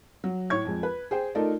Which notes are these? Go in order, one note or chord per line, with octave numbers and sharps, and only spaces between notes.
F#3
A2 C#5 C#6 G#6
F2 G#3
B4
G#4 C5 G5
A3 D#4 F4 A4 A#4 D5